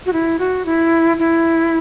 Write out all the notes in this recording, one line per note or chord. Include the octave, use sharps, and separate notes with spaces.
F#4
E4
F#4
E4
E4